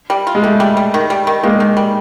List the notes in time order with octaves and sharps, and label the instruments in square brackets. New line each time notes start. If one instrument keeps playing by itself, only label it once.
[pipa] G3
F4
[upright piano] G#3
[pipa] G3 [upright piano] A3
[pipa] G3
G3
D#3
G3
D#3
[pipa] D#3 [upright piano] G#3 A#3
[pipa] D#3
G3